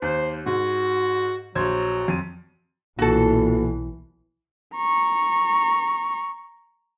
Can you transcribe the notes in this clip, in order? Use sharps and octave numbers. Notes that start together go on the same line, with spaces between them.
D#2 C5
G#2 F#4
A#1 F#3 C5 G#6
F2 D#7
B1 A#2 E3 F#4 A4
A#5 C#6